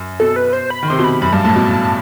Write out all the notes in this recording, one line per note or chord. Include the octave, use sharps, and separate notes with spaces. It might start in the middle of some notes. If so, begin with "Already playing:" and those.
Already playing: F#2
B2 A4
B4
C5
B5
D#3
C3 C6
B2
B5
F#2 B5
G2 A5
A2 A5
B2